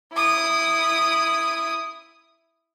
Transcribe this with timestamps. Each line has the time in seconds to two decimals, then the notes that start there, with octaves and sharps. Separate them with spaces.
0.12 E4 D#6